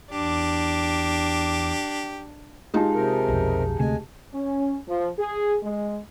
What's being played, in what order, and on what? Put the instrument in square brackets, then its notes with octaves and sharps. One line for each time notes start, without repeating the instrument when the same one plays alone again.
[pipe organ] E2 D6 [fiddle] D4 [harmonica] G4
[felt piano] G#3 D#4 F4 [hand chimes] G4 G#4 A5
[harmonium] C3 A#4
[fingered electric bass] B1 F2
[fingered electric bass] D2 C3 A3 [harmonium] G#3 G#5
[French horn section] C#4
F3
G#4
G#3